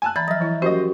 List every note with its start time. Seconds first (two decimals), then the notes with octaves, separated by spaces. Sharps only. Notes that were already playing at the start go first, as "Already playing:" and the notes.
0.02 G#5 A5 F#6
0.16 E3 D5 A#5 B5 A6
0.28 F3 F#3 D#5 E5 F6 A#6
0.41 E3 E4
0.62 F3 F#3 C#4 F#4 G4 A#4 C5 D#5